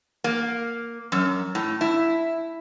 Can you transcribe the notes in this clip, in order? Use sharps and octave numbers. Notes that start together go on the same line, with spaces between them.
A#3
F#2
A2
E4